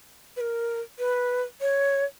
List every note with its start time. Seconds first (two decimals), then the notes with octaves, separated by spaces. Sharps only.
0.37 B4
0.41 A#4
0.99 B4
1.61 C#5